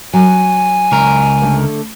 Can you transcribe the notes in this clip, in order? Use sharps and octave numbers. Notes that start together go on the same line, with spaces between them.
F#3 G#5
C#2 A#4
D3 A3